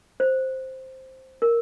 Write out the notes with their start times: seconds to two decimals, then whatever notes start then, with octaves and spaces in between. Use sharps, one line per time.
0.20 C5
1.42 A#4